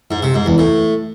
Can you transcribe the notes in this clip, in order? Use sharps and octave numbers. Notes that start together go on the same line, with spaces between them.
G#2
C3
G#2
E2
A2